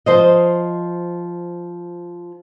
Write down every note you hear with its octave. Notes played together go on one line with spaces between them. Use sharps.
F3 C5 D#5